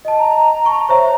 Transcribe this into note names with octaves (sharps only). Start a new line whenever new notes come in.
D#5 A5
A#5
A5 C#6
C5 C#5 E5 A#5